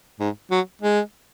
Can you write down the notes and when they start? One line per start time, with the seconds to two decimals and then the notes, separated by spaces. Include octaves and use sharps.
0.20 G#2
0.51 F#3
0.82 G#3